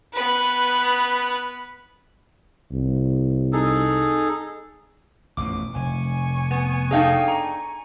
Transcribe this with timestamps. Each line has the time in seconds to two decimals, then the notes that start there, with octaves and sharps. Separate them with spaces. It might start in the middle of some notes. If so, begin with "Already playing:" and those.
0.13 B3 B4
2.71 C2
3.53 D#4 G#4 A4
5.37 A1 F2 B2 D6
5.76 F1 G#5 C#6
6.51 B3
6.91 D4 D#4 G#4 A4 F5 G5
7.28 A#5